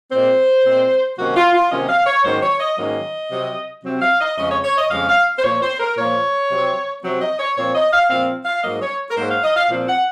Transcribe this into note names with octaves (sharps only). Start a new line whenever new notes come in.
A#2 G#3 C4 C5
A#2 G#3 C4
C3 D#3 F#3 A#3 C#4 F#4
F4
F4
C3 D#3 F#3 A#3 C#4 D#5
F5
C#5
G#2 D#3 F#3 A#3 C#4 C5
C#5
D#5
G#2 D#3 F#3 A#3 C#4 D#5
C3 F#3 C4
C3 F#3 C4
F5
D#5
F2 C#3 G#3 C#4 D#5
C#5
C#5
D#5
F2 C#3 G#3 C#4 F5
F5
C5
A#2 F3 A#3 C#5
C5
A#4
A#2 F3 A#3 C#5
C3 F#3 C4
C3 F#3 C4
D#5
C#5
A#2 F3 C4 C#5
D#5
F5
A#2 F3 C4 F5
F5
G#2 F#3 A#3 D#5
C#5
A#4
G#2 F#3 A#3 C5
F5
D#5
F5
A#2 F3 C4
F#5